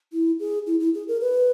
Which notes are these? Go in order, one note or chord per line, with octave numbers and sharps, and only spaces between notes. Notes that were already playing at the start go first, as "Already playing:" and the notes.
E4
G#4
E4
E4
G#4
A#4
B4